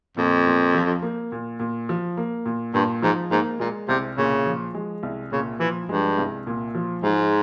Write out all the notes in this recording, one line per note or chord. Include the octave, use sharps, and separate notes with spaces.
F2 A#2
A#2
F3
A#3
A#2
A#2
F3
A#3
A#2
G2 A#2
G#2 F3
G#2 A#3
A#2 G#3
C2 C3
A#2 C#3
F3
G#3
C2
A#2 C#3
E3 F3
G2 G#3
C2
A#2
F3
G#2 G#3